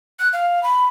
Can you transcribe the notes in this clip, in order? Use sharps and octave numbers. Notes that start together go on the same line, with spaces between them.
F#6
F5
B5